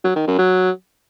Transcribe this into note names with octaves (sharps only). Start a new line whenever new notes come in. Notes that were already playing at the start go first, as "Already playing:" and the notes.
F#3
D#3
F#2
F#3